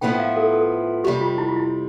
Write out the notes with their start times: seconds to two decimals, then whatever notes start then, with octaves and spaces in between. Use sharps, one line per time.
0.01 A2 F3 B3 E4 B4 G5
0.20 F5
0.36 A4
0.53 A4
1.04 F2 C3 G3 G4
1.21 F4
1.38 E4
1.48 F4
1.56 E4